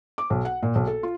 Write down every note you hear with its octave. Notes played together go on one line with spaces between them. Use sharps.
D6
B1
F#5
A#2
B1
A4
F4